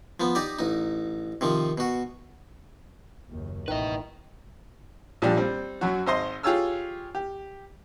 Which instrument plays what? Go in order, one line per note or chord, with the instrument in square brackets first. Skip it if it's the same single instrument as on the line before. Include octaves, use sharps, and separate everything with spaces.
[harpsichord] F3 B3
D#4 G4 D5
A1 D#4
C3 D#3 F3
B2 F#4
[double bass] F#1 D#2
[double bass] A1 [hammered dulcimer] D#3 E4 [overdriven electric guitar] B4 D#5
[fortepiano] A#1 F3 G3 D4 G4
G3 C4
F#2 F#3 F#4
G#1 C5 D#5 C6
F4 G4 G#4 C#5 E6 F6
G4